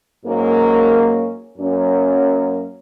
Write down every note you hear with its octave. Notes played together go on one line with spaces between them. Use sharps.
G#2 F#3 A#3 C#4
F#2 F#3 A#3 C#4